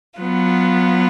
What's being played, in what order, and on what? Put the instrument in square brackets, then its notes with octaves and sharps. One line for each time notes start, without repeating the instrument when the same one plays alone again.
[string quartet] F#3 B3 F4